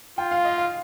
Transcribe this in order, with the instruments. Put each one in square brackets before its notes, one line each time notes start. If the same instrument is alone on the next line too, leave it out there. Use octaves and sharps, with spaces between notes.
[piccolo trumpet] F4 [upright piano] G5
[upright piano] F5
D#5
F5